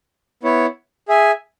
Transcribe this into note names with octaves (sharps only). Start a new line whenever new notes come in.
B3 E4 C#5
G#4 E5 G#5